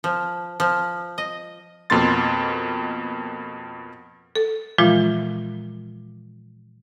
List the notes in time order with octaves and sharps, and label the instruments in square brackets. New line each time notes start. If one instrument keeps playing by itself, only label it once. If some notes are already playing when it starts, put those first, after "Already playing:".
[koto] F3
F3
D#5
[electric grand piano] F2 B2 A#3 C6 A6
[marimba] A4
A#2 E3 F3 G#3 F4